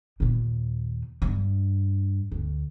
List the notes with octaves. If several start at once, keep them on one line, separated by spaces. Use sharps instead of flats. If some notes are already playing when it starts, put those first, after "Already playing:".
D#2 A#2
G2
D2